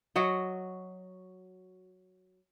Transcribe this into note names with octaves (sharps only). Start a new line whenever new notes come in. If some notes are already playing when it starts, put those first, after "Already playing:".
F#3 F#4 D#5